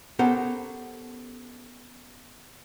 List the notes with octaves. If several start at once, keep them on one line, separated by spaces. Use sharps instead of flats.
B3 C#4 G4 A4 A#4 C5